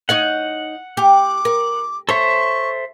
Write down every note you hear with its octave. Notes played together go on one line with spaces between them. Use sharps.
D#4 C#5 D#5 F#5
G4 D6
A#4
A4 C5 C#5 E5 C#6